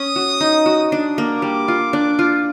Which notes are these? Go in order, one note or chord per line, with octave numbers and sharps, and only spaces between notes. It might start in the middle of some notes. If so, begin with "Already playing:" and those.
Already playing: C#4 D#6
F#4
D#4
F#4
D4
A#3 D6
G3
F4
D4
F4